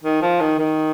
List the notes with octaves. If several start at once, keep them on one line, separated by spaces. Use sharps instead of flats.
D#3
F3
D#3
D#3